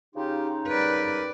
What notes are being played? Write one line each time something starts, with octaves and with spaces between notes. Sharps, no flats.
C#3 C#4 D#4 F4 G4
G3 A#4 B4 D5